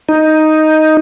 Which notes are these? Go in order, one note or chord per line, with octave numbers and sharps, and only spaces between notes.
D#4